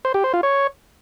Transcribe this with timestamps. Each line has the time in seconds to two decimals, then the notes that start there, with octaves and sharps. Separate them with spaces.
0.05 C5
0.14 G4
0.24 C5
0.34 F4
0.43 C#5